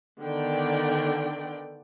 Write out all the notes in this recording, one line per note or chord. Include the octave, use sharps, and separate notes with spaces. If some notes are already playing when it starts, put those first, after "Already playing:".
D3 D#3 B3 D5 G5